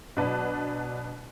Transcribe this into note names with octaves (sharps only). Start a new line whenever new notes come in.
B2 F#3 D4 B4 A5